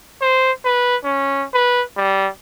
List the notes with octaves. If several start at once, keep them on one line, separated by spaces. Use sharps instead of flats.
C5
B4
C#4
B4
G3